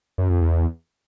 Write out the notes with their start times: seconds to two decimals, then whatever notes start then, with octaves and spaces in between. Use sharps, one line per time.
0.18 F#2
0.30 F2
0.41 E2